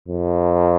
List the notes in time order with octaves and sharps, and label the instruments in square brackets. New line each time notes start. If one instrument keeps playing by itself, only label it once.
[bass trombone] F2